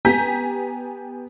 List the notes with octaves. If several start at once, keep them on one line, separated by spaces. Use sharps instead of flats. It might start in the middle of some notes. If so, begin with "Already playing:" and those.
B3 G4 G#5 A#5 G6 B6